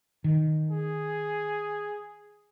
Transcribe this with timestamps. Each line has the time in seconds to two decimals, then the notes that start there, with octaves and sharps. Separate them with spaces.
0.24 D#3
0.71 G#4